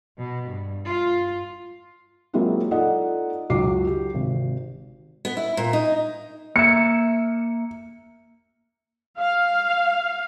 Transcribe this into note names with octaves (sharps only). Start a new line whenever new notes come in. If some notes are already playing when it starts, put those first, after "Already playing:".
B2
G2
F4
F#3 G#3 A#3 C4 E4 F4
D#4 F4 A4 D5 D#5 F#5
C#2 F#2 D#4 F#4 D6 C7
G4
G#1 C3
B3
E4
A#2
D#4
A#3 E5 C#7
F5